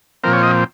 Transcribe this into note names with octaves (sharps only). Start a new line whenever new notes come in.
A#2 F3 C4 A#4
C#5
D#5